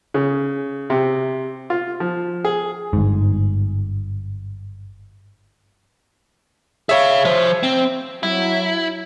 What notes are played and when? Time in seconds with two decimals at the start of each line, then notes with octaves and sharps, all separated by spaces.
0.14 C#3
0.90 C3
1.70 F4
2.00 F3
2.45 G#4
2.93 G1 G#2
6.89 G#4 C#5 E5 F5
7.25 F3 C5
7.63 C4
8.23 F#3 E4